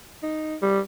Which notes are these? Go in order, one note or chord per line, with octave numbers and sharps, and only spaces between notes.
D#4
G3